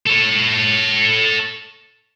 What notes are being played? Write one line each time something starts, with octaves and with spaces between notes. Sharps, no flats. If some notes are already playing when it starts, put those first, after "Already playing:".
A4 C#5